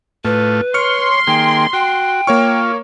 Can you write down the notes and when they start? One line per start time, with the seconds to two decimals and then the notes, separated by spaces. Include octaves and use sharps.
0.25 A2 A3 F4 B4
0.74 C#5 C6 F6 C#7
1.27 D#3 A#3 G#4 G5
1.73 F#4 G5
2.27 A#3 F4 C#5 C#6